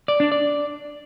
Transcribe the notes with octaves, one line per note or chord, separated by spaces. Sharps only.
D5
D4
D5